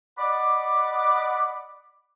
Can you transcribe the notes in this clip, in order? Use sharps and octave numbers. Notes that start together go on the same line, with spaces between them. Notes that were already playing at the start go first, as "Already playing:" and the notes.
D5 D#5 F#5 B5 D6